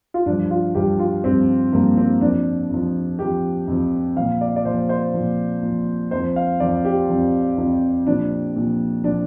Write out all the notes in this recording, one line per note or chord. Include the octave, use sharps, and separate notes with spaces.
F4
G2 F3 D4
F4
G2 F3 G4
F4
G2 F3 C4
G2 F3 A#3
C4
F2 F3 D4
F2 F3
F2 F3 G4
F2 F3
A#2 F3 F5
D5
D5
A#2 F3 C5
C5
A#2 F3
A#2 F3
F2 F3 C5
F5
F2 F3 D5
G4
F2 F3
F2 F3
A#2 F3 D4
A#2 F3
A#2 F3 D4